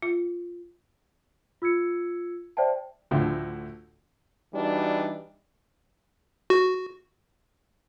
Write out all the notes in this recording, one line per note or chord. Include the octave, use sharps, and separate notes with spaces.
F4
F4 E6 G#6 C#7
C5 D5 E5 G5 A5
D2 A2 D3 F3
E3 G3 D4 D#4 F#4
F#4